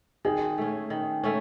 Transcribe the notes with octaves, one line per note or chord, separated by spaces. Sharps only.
D#3 G#4
A3 C#4
D#3
A3 C#4